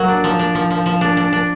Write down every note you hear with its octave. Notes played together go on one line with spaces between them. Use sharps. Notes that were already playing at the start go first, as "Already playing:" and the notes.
Already playing: F#3 A#3
D4
F3
D4
F3
F3
F3
D4
D4
D4